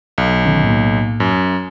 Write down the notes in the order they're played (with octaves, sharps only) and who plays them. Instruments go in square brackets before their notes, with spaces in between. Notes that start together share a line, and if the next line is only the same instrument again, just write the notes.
[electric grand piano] B1
[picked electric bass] D3 D#3 C#4
A2 A#3
[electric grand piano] F#2